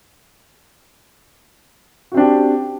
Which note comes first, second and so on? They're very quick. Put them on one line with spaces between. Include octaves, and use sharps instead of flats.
F#4 C4 D4 G4